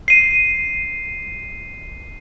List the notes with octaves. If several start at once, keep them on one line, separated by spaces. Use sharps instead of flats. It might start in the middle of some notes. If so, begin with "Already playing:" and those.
C7 D#7